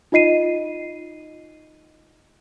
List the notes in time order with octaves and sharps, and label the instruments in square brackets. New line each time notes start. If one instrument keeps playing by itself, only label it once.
[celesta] D#4 F4 D#5 C7 D#7